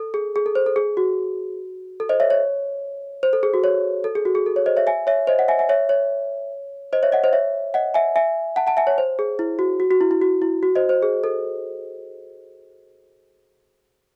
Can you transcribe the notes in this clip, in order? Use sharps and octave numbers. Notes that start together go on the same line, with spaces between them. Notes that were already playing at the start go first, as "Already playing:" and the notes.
Already playing: A4
G#4
G#4
A4
C5
A4
G#4
F#4
A4
C5 D#5
C#5 E5
C#5
C5
A4
G#4
F#4
C#5
A4
G#4
F#4
G#4
A4
C#5
C5 D#5
C#5 E5
E5 G#5
C#5 E5
C5 D#5
D#5 F#5
E5 G#5
E5 G#5
C#5 E5
C#5
C5 D#5
C#5 E5
D#5 F#5
C5 D#5
C#5 E5
D#5 F#5
E5 G#5
E5 G#5
F#5 A5
F#5 A5
E5 G#5
C#5
C5
G#4
E4
F#4
F#4
F#4
E4
E4
F#4
E4
F#4
C5 D#5
C5
G#4
A4